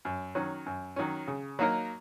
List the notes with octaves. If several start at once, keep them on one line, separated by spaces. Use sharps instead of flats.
F#2
D#3 F#3 C#4
F#2
D#3 F#3 C#4
C#3
F#3 A#3 D#4 A#4